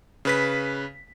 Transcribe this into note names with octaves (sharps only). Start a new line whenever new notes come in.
C#3 B4 B6